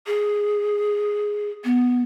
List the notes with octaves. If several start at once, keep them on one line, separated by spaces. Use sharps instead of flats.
G#4
B3